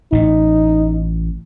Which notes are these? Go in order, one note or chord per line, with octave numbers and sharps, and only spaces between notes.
A1 A2 D#4